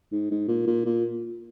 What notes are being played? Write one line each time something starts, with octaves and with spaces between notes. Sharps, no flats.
G#2
G#2
A#2
A#2
A#2